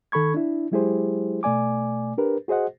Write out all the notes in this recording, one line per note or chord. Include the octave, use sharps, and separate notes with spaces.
D#3 A4 B5 C#6 G#6
D4 E4
F#3 G#3 E4 G4 G#4 C5
B2 A3 D5 G#5 D6
D4 G4 A#4 B4
F#4 G#4 C5 D#5 F#5